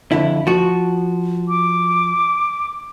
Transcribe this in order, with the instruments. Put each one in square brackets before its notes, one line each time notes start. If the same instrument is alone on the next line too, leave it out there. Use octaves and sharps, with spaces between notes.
[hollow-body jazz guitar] F2 D3 E4
F3 F#4
[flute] D6